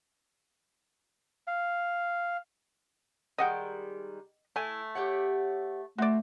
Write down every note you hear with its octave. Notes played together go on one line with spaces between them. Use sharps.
F5
D#3 G3 G#3 D#5 F#5 G5
A3 E4 G#5
G4 C#5 F#5
A3 C4 F#4 D5